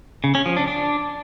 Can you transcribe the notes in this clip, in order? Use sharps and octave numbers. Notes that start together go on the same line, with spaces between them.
C#3
C#4
F3
D4
D4